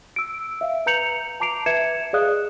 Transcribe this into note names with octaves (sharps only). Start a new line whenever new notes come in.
E6 D7
E5 F5
B4 A#5 G6 C#7 F7 F#7
A5 A#5 D6 C7 D7 F7
B4 E5 G#6 C#7 E7
G#4 D5 D#5 F5 D#6 F#6